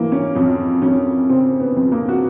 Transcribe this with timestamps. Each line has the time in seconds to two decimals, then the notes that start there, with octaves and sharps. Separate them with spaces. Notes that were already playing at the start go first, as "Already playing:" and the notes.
Already playing: E3 A#3
0.12 C#4
0.35 F2 C#4
0.82 F2 C#4
1.29 C#3 C4
1.60 B3
1.76 F2
1.92 A#3
2.09 F#4